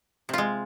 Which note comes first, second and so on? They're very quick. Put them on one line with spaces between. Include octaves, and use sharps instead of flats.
C3 F4 G#3